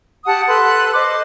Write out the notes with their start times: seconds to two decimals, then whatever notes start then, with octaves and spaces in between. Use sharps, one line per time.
0.24 G4 F#5 A5 D#6
0.47 A4 B4 C6 F#6
0.94 C5 D#5 C6 D6